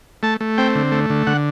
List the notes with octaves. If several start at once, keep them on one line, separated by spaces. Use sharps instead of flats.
A3 A5
A3
C4 G5
D3
A3
D3
D3 F#5